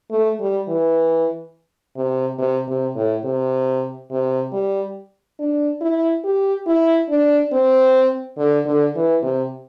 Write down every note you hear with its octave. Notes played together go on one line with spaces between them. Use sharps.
A3
G3
E3
C3
C3
C3
A2
C3
C3
G3
D4
E4
G4
E4
D4
C4
D3
D3
E3
C3